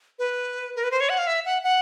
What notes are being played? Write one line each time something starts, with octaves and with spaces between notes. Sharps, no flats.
B4
A#4
B4
C5
C#5
F#5
F5
E5
F#5
F#5